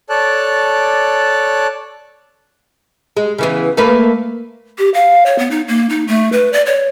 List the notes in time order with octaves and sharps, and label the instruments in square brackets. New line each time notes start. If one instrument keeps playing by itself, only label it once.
[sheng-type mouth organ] A4 C#5 D5 A5 F#6
[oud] G#3
C#3 E3 B3
A3 A#3 B4
[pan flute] G4
F5
C#5
B3
D#4
A#3
D#4
A3
B4
D5
C#5